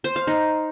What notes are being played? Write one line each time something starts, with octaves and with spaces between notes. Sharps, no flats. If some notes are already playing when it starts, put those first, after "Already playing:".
C5
F5
D#4